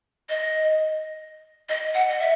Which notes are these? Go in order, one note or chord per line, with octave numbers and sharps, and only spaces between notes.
D#5
D#5
F#5
D#5
E5